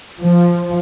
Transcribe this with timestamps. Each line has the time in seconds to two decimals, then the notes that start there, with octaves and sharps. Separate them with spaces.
0.21 F3